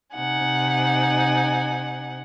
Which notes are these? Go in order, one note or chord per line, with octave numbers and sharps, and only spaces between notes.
C3 D#4 F#5 G#5